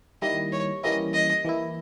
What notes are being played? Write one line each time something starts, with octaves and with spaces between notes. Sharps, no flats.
D#3 G3 A#3 E4 D#5
C#5
E3 G3 A#3 C#4 E4 D#5
D#5
E3 A#3 E4